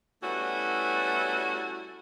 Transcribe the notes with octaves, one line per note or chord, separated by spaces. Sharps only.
G3 A3 B3 C#4 E4 F#4